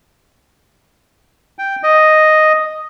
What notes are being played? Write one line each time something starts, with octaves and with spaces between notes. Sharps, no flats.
G5
D#5